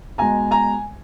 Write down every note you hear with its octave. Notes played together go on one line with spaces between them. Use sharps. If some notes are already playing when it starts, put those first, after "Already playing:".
B2 G#3 G#5 A#5
G#5 A#5